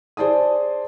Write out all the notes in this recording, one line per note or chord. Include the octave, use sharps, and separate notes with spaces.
G#4 C5 D5 A5 D#6